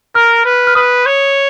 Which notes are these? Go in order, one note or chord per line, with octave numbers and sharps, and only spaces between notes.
A#4 F6
B4
F6
B4 D#6
C#5